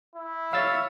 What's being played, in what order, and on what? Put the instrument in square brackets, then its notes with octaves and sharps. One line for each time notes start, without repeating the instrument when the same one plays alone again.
[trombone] E4
[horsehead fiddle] C#5 E5 [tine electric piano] F5 E6 A6